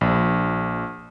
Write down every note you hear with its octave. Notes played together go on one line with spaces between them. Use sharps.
A#1